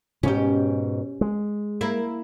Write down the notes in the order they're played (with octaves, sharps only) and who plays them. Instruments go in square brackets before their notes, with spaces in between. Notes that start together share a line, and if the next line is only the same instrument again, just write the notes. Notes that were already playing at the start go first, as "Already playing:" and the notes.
[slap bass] G#2 B2 [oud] C#4 G4
[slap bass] G#3
[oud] A#3 E4